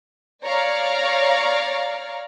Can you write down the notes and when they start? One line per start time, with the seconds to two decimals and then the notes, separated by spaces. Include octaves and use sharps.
0.44 C#5 D5 F5 A#5